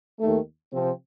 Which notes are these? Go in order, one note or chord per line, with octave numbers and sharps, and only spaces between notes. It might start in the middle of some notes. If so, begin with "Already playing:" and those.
D#2 D#3 A3
C3 F3 C4